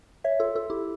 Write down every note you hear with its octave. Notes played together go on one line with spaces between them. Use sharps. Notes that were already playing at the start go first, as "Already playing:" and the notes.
C#5 E5
F4 A4
F4 A4
E4 G4